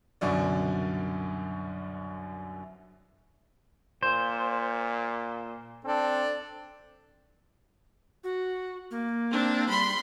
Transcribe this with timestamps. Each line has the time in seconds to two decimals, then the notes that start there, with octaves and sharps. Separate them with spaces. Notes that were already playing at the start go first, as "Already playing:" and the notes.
0.21 C2 F#2 B2 D3 D5
4.03 A#2 C5
5.85 C4 D4 A4
8.24 F#4
8.91 A#3
9.32 C4 D4
9.69 G3 B5 C6